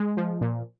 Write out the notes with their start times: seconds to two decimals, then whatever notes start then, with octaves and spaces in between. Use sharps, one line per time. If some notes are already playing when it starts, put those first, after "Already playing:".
Already playing: G#3
0.17 F3
0.41 A#2